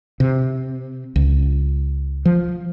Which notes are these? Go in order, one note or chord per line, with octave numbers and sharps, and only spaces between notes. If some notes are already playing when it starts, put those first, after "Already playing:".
C3
C#2
F3